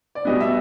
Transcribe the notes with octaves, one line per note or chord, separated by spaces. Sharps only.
D5
B2 G3 B3 D#5
E5